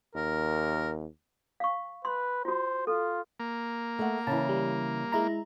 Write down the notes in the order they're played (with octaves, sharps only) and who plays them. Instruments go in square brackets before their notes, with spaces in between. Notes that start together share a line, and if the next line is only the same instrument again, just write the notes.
[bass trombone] D#2 [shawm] A#4
[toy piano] F5 C#6
[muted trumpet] B4 [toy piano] C6
[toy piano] F4 F#4 [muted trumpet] C5
[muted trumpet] F4 [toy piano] A4
[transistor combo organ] A#3
[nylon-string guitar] A3 F#5
[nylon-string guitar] C#3 E3 [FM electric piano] A5
[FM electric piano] G3
G#3 E4 A#5